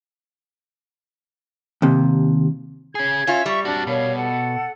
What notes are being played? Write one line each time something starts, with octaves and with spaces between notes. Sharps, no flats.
D#2 C3
C#4 G#4 G#6
C#4 F4 E5
G3 C#6
C4 D4 F#4
B2 A#4 C#5 F5
A4 F#5